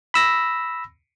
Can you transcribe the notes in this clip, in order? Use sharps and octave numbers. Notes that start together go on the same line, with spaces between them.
B5 E6 A#6